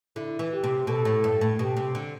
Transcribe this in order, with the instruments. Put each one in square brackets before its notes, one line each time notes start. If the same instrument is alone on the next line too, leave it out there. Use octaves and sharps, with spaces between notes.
[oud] D3 [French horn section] E4
[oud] E3
[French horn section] G4
[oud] C3
[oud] B2 [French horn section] A4
[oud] A2
G2
A2
[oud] B2 [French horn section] G4
[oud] C3
D3